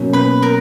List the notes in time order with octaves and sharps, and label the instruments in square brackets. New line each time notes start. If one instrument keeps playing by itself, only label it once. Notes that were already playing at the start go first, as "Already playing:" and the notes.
Already playing: [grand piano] B2 F#3 A#3 C#4
[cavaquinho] B4 B5
A#4 A#5